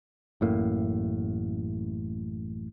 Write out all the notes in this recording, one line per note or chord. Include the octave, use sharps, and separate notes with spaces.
A1 F#2 A2 A#3